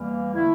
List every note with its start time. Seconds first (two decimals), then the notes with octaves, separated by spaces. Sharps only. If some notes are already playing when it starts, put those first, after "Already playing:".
Already playing: E2 E3 G3 A#3
0.33 D3 A3 E4